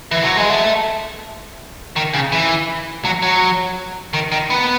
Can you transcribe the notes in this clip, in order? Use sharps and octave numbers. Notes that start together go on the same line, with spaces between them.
E3
F#3
G#3
A3
D#3
C#3
E3
F#3
F#3
D#3
D#3
B3